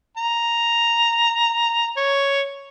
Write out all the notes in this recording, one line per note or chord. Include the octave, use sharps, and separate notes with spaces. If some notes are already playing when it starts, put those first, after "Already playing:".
A#5
C#5